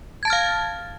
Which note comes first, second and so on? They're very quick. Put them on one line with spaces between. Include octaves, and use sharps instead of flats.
G#6 A5 A6 F6 F5